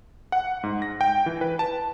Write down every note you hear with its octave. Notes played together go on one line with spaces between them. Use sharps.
F#5
G#2
A#6
G5
E3
B4
A5